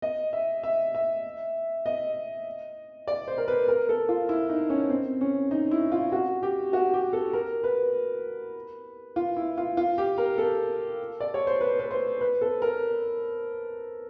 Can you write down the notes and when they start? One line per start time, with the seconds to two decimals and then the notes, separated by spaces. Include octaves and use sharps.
0.02 D#5
0.33 E5
0.63 E5
0.95 E5
1.86 D#5
3.08 D5
3.28 C5
3.38 A#4
3.48 B4
3.68 A#4
3.89 A4
4.09 F4
4.29 E4
4.49 D#4
4.70 C#4
4.90 C4
5.21 C#4
5.51 D#4
5.71 E4
5.92 F4
6.12 F#4
6.43 G4
6.73 F#4
6.93 G4
7.13 A4
7.33 A#4
7.64 B4
9.16 F4
9.37 E4
9.57 F4
9.77 F4
9.98 G4
10.18 A#4
10.38 A4
11.20 D5
11.34 C#5
11.47 C5
11.61 B4
11.79 B4
11.91 C5
12.21 B4
12.41 A4
12.62 A#4